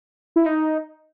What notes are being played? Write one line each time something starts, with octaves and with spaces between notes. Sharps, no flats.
E4
D#4